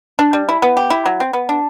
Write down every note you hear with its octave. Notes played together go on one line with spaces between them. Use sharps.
D4
G3
E4
B3
G4
E4
F#3
C4
B3
D4